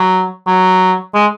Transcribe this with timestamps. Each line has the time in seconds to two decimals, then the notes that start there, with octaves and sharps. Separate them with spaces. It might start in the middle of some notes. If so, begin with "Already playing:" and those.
Already playing: F#3
0.47 F#3
1.14 G#3